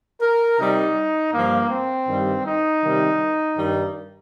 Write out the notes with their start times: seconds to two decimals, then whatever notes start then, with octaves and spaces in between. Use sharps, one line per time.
0.20 A#4
0.58 C3 G3 D#4
1.33 G2 F3 A#3
1.71 C4
2.08 G2 D#3 G3
2.45 D#4
2.82 C3 D#3 G3
3.57 G2 D#3 G3